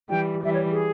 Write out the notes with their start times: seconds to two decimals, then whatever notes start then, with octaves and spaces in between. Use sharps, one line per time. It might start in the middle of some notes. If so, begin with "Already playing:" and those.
0.09 E3 G3 G5
0.44 E3 G3 E5
0.53 C#5
0.71 G#4